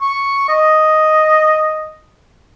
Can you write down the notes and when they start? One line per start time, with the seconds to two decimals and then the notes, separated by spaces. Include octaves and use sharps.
0.01 C#6
0.49 D#5